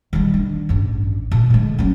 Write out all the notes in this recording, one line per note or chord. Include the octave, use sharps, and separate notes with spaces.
D#3 G3
D4
A1 G2
A#2
D3 G#3
F#3 C#4